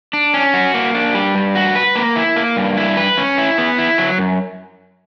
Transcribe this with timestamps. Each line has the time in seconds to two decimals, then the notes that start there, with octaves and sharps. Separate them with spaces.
0.13 D4
0.34 C#4
0.54 F#4
0.74 A#3
0.95 D4
1.15 G3
1.35 G2
1.55 F#4
1.75 B4
1.96 A#3
2.16 E4
2.36 A#3
2.57 G2
2.77 E4
2.97 B4
3.18 C#4
3.38 E4
3.58 B3
3.78 E4
3.98 F#3
4.19 F#2